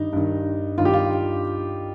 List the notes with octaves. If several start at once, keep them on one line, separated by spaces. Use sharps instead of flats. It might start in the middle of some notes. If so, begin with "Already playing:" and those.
Already playing: G2 D#3 D#4
G2 D#3
G2 D#3 F4
G4
F4